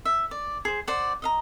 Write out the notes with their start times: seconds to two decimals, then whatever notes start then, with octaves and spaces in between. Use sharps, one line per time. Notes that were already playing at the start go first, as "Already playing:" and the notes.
0.05 E5
0.31 D5
0.65 G#4 C5
0.87 C5 D5 F#5
1.22 D#5 F5 A#5